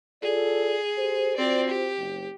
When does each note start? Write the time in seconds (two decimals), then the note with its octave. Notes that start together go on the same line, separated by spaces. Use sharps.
0.22 F4 G#4 A4 D5
0.96 G4 A4 C5
1.37 C4 F4 F#4 C5 D5
1.68 G4
1.96 F#1